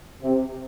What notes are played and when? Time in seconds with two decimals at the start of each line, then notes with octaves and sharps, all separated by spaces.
0.22 C3